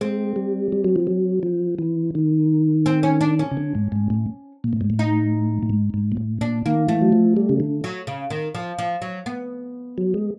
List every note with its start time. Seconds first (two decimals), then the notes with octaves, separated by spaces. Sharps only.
0.01 G#3 C4
0.36 G3
0.72 G3
0.84 F#3
0.96 F3
1.07 F#3
1.43 F3
1.79 E3
2.15 D#3
2.86 C4
3.03 C#4
3.21 D4
3.39 C#4
3.51 C#3
3.57 D3
3.75 G#2
3.92 G#2
4.10 A2
4.64 A#2
4.73 A2
4.81 G#2
4.90 A2
4.99 D#4
5.63 A2
5.70 G#2
5.94 G#2
6.12 A#2
6.17 A2
6.41 A#2 D4
6.66 D#3 A#3
6.88 E3 A3
7.01 F#3
7.12 F3
7.37 G3
7.49 C#3
7.60 D3
7.84 F#3
8.07 C#3
8.30 D#3
8.55 F3
8.78 F3
9.02 F#3
9.26 B3
9.98 F#3
10.14 G#3